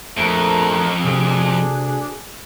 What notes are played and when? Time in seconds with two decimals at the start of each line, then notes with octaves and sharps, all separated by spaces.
0.17 A#1 F2 A3 A#5
1.04 D2 C3 D4 G#4 D#6